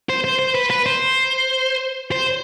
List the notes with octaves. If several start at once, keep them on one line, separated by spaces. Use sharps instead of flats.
C5
C5
C5
B4
B4
C5
C5